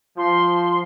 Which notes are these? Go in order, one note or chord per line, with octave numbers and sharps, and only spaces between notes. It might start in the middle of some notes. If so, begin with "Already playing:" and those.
F3 C6